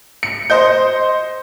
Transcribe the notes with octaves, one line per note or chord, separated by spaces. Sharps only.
C#7
C5 D#5 G6